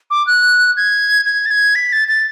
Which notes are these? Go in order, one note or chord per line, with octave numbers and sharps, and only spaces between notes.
D6
F#6
G#6
G#6
A6
G#6
B6
A6
A6